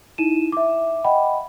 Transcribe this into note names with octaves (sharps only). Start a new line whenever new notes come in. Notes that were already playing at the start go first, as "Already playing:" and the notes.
D#4 E4 D#7 E7
E5 D6
D#5 F#5 G5 B5